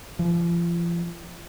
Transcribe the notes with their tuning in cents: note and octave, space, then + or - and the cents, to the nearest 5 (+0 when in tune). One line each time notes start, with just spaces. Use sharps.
F3 -35